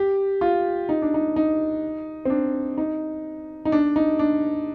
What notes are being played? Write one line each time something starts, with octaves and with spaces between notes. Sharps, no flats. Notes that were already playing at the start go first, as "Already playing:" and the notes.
Already playing: G4
F4
D#4
D4
D#4
D#4
C4
D4
D#4
D#4
D4
D#4
D4